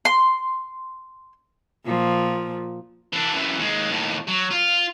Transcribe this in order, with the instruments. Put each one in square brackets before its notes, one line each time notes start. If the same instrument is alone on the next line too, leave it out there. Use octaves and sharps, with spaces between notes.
[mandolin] C6
[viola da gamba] A#2 F3
[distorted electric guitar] E3 D4
F#2 E3
D#2 G#3
D#2 A2
F#3
F4